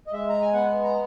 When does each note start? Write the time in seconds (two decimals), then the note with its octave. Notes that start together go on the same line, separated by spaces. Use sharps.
0.07 D#5
0.13 G#3 E5
0.29 A#5
0.41 G#5
0.54 B3 F#5
0.84 A#5